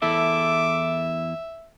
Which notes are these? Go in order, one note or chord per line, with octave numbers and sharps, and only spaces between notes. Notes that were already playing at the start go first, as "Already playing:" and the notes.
E2 E4 A4 E5 D6